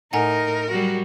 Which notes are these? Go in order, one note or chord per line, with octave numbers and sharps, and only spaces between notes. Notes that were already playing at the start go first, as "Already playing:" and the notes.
A2 D#4 A#4 F#5 G#5 A#5
F#3 G3 F#4